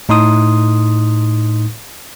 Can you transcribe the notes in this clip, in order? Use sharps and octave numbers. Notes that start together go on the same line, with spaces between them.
A2 D#4 C6 D#6